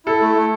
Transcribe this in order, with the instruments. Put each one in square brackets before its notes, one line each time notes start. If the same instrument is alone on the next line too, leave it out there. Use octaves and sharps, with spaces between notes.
[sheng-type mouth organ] E4 [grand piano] A4
[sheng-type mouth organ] A3
A3